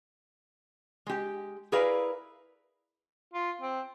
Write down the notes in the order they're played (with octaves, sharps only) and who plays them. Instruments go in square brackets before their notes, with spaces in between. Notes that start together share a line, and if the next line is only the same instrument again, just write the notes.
[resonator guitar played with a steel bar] G#3 G4
E4 G#4 A#4 B4 D5 F5
[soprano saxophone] F4
C4